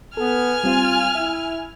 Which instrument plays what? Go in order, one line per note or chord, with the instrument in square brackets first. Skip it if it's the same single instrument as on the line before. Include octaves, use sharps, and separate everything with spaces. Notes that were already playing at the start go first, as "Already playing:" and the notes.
[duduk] B3 [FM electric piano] A4 [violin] G#5 F6
[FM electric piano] G3 C4 F5 [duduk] F4
[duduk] E4 [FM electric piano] E5